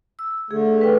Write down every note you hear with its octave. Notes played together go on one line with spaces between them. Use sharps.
E6
D3 A3 G#4
B4 G5